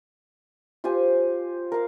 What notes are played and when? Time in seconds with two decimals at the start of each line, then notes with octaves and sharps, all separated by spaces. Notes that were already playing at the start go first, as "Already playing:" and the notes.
0.84 F4 G4 C5 G#5
1.72 A#4 F5